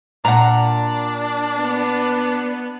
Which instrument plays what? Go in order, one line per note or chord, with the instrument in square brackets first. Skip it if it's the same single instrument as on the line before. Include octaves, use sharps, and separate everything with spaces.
[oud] A#2 [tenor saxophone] D4 [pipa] F#5 A#5
[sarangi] B3